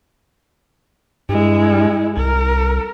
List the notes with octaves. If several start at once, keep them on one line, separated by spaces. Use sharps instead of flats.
G2 G#3 E4
C2 A#4